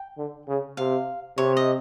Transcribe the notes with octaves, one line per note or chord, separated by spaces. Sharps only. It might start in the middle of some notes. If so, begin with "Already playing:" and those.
Already playing: G5
D3
C#3
C3 F5
C3 C#5
D#5